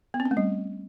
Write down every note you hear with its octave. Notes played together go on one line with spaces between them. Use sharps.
B3
C4
C#4
A3
G3